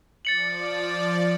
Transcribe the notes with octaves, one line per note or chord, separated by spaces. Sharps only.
F3 D5 A6 C#7 F#7